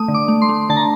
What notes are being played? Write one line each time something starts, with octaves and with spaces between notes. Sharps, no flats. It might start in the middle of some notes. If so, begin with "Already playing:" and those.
Already playing: A3 D#6
D3
D6
A3
C6
A3
D3 A5
A#5